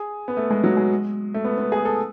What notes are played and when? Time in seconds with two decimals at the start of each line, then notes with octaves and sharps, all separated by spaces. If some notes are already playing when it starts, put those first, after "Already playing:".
Already playing: G#4
0.28 B3
0.37 A3
0.50 G#3
0.64 F#3
0.77 G#3
1.34 A3
1.44 B3
1.58 B3
1.72 G#4
1.85 A4